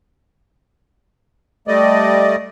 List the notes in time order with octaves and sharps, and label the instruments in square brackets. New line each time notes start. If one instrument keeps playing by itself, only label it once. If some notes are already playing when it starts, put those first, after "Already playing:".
[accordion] G3 A3 D5 D#5